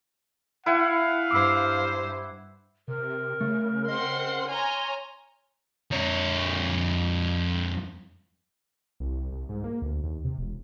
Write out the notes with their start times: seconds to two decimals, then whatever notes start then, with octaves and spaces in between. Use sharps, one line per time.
0.66 E4 F5 F#5 G#5
1.31 G2 C5 D6 E6
2.88 C3 A#4
3.41 C#3 A3
3.88 C4 D#5 F#5 C6
4.50 C#5 G#5 A#5 C6 F6
5.91 F2 C#5
9.00 C2
9.32 C2
9.49 G#2
9.64 A#3
9.82 D2
10.04 D#2
10.25 C3
10.38 E1